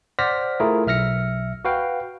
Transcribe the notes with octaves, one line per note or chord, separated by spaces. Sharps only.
C5 D5 F#5 F6 A#6 B6
A3 E4 F4 G#4 A#4
B1 E5 F6 A#6 C#7
F#4 B4 F5 G5